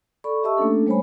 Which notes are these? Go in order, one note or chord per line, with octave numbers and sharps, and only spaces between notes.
A4 D5 B5 C#6
G4 D#5 E5 A5 C#6 E6
A3 A#3 C#4 D4 A4
G3 A3 C5 C#5 G#5 B5